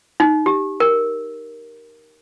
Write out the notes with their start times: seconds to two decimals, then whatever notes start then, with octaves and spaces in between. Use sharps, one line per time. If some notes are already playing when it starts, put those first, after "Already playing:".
0.20 D#4
0.46 G4
0.80 A#4